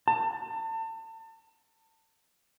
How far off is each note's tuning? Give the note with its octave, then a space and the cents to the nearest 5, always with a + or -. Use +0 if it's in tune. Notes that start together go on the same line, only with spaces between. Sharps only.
A5 +35